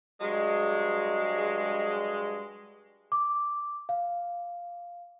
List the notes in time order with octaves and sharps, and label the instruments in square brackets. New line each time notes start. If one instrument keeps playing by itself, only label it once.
[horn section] G2 F#3 G#3
[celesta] D6
F5